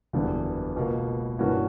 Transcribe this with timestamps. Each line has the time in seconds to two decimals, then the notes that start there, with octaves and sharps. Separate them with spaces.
0.13 F#1 E2 D3 G3 B3
0.76 C#2 B2 A#3
1.39 G2 E3 A#3 C#4 F#4